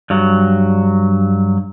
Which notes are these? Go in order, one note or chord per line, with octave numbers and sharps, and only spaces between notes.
G2 F#3